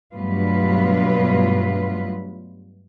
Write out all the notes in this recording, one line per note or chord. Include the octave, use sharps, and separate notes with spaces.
G2 B2 F#3 A3 F4 B4